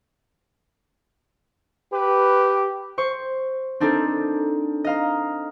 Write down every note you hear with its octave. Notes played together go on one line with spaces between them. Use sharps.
G4 B4
C5 C#6
C4 D4 D#4 A4 A#4 D5
D#5 F5 A#5